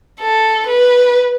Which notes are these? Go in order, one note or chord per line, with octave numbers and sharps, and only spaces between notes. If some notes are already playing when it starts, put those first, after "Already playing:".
A4
B4